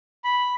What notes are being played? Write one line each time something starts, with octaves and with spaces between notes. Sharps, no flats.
B5